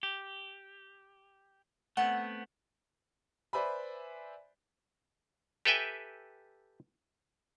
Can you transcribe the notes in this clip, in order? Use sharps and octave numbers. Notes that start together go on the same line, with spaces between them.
G4
A3 B3 C4 F#5
B4 C5 D5 E5 G#5 B5
G4 A4 B4 E5 G5 G#5